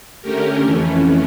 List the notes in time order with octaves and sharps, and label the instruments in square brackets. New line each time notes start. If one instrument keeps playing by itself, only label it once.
[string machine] D3 A3 C#4 G4 A#4
F2 E3 A3 C#4